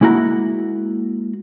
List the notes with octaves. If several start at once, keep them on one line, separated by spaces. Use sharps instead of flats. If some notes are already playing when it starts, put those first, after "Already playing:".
G#3 A#3 E4 F#4 F#5 A#5